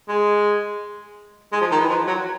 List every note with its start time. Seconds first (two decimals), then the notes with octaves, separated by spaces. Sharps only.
0.08 G#3
1.52 G#3
1.61 F3
1.71 D#3
1.80 E3
1.89 F3
2.07 F#3